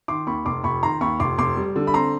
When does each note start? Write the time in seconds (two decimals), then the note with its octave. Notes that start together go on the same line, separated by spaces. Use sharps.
0.08 D#3 C6 D6
0.27 D#2 B5 C#6
0.45 F1 C6 D6
0.64 F1 B5 C#6
0.83 D#3 A#5 C6
1.01 D#2 B5 C#6
1.20 F1 C6 D6
1.38 F1 C6 D6
1.57 G3
1.76 D3
1.87 B5
1.94 C4 A#5 C6